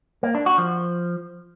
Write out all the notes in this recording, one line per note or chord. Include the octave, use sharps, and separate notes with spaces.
A#3
D4
F#4
F3